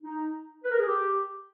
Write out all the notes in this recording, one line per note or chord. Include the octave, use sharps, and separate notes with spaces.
D#4
B4
A#4
G#4
G4